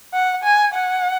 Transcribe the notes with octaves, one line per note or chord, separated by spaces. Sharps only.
F#5
G#5
F#5